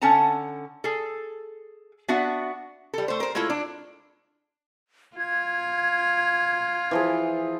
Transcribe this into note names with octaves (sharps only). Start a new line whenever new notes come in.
D3 C#4 A4 F#5 A5 A#5
G#4 A4
B3 D4 F#4 E5 F#5
G3 A4
A3 C5
A#4 C5
G#3 A3 E4 F4 A4
D4
F4 G#6
E3 F3 G#4